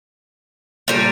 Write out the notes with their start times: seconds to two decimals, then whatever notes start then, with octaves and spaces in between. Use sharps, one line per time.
0.88 A#2 G3 D4